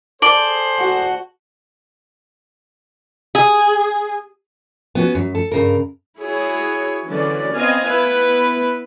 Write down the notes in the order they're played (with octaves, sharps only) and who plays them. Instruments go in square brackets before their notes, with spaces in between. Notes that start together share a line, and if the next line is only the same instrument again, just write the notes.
[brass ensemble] G#4 A4 C5 [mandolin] D5 [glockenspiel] A5 F#7 G7
[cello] F#4
[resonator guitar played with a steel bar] G#4
[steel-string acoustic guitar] B3 C#4 F#4
F#2
A4
G2 C#3 A#4
[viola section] E4 F#4 G#4 C#5
D3 E3 F#3 C#4 D5
B3 C4 D#5 F5 G#5
B3 E4 B4